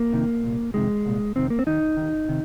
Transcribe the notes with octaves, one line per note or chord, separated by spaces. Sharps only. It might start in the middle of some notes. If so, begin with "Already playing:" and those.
Already playing: A#3
F2 C3 D#3
C2 A#2
F2 C3 D#3 G#3
C2 A#2
F2 C3 D#3 C4
A#3
C4
D#2 D#3 D#4
D#2 D#3
C3 D#3